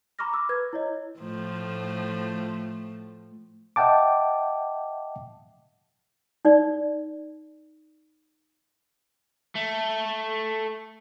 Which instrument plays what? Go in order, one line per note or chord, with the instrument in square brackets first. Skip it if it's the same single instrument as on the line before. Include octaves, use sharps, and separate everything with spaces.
[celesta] A#5 B5 C#6 D6 F6 A#6
D6 E6
B4 G#6
E4 C#5 D#5
[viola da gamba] A2 F3 A3
[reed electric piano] D#5 E5 F#5 G5 A5 D6
[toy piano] D#4 D5
[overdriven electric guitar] A3